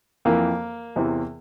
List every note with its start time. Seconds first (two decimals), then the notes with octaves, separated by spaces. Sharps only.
0.25 F2 E3 A#3
0.96 E2 C3 E3